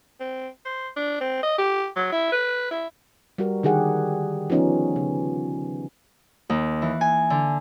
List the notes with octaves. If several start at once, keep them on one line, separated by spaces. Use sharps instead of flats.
C4
C5
D4
C4
D#5
G4
F#3
E4
B4
E4
G3 F#4 A#4
D3 D#3 G4 G#4 F#5
F3 B3 C#4 D#4
C#3
D#2
E3
G#5
D3